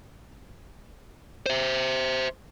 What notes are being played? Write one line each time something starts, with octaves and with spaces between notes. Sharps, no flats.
C5 E5